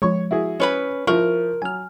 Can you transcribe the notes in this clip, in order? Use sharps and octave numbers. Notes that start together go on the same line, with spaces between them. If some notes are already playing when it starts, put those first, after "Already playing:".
F3 G#3 C#5 C#6
E4 F#4 G#4
C#4 B4 B5
F3 E4 F4 A#4 C#6
F#3 G#5 F6